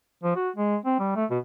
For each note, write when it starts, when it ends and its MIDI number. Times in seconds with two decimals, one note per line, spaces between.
0.23 0.36 53
0.36 0.49 66
0.56 0.76 56
0.85 0.96 60
0.99 1.12 55
1.16 1.25 57
1.30 1.38 47